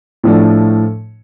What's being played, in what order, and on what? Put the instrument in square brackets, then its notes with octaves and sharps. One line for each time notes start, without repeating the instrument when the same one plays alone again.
[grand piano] A2 F3 A3 D4